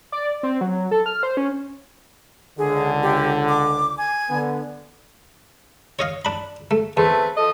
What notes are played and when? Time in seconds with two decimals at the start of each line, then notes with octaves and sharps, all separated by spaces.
0.12 D5
0.43 C4
0.61 F#3
0.91 A4
1.06 F6
1.23 C5
1.37 C#4
2.58 C#2 D3 G#4
3.03 G4
3.48 D6
3.98 G#5
4.30 D3 B3
5.99 C#5 D#5 F5
6.25 D4 B5
6.71 A3
6.97 E2 A3 C4 B4
7.37 F3 A4 D#5